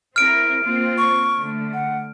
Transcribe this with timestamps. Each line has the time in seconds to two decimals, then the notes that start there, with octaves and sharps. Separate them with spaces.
0.16 C4 E4 A#4 F6 D7
0.64 A#3 C4 F4
0.98 C#6
1.38 D3 A3
1.73 F#5